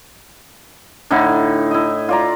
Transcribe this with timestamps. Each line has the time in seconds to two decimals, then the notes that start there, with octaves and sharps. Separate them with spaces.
1.11 A2 D3 D#4 E4
1.71 E4 D#5
2.09 F4 D5 A#5